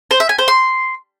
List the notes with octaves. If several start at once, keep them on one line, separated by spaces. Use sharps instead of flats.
C5
E5
G#5
C5
C6